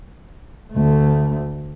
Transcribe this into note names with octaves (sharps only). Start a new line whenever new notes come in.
D2 A3